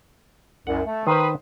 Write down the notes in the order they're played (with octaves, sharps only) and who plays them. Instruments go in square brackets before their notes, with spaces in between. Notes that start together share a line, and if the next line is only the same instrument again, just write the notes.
[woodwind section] C2 F#2 [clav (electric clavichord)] F#5
[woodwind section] A3
[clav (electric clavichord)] D#3 C5 [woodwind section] B4 C6 D#6